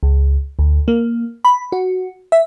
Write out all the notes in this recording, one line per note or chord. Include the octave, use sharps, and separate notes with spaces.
C#2
D2
A#3
B5
F#4
E5